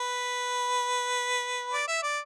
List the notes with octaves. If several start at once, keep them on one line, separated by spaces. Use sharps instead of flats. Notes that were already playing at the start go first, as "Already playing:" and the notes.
Already playing: B4
D5
E5
D5